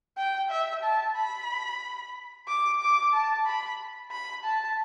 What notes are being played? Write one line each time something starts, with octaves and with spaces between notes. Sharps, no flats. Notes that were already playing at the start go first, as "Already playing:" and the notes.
G5
E5
A5
B5
D6
D6
A5
B5
B5
A5